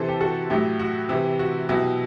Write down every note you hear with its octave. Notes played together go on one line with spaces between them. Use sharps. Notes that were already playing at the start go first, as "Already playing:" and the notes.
Already playing: C3 E3 A4 C5
G4
F#4 A4
A2 F#3 E4 G4
F#4
C3 E3 E4 G4
F#4
B2 F#3 E4 G4